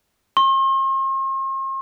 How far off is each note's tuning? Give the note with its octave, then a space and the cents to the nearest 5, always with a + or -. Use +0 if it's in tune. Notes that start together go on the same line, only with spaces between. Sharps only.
C6 +45